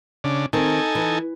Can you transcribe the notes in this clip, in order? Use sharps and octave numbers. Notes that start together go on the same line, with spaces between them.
C#3 D4
D#3 C4 D#4 A4 G#5
E3